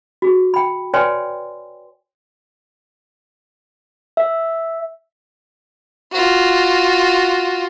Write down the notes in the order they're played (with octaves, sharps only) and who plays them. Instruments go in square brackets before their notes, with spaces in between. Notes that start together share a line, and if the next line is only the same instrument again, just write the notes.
[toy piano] F#4 G#4
G5 B5
B4 C#5 D5 G5 G#5 C6
[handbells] E5
[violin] F4 F#4